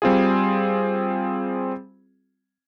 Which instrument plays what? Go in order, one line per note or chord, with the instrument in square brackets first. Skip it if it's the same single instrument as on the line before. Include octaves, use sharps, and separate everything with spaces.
[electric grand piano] G3 C4 F4 G#4